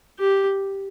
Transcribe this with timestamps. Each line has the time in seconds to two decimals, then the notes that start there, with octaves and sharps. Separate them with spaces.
0.20 G4